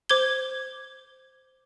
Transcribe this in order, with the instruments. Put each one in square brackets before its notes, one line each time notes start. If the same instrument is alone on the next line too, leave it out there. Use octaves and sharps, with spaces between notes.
[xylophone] C5 D6 G6 G#6 G7